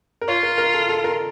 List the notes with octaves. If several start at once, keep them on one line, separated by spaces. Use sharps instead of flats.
A#4
F4 C#5
A#4
A#4
A4
A4
A#4